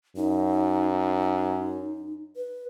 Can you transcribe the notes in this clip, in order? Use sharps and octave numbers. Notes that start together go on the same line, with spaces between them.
F#2 D#4
B4